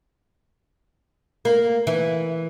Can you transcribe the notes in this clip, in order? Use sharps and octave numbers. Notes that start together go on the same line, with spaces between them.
A#3
E3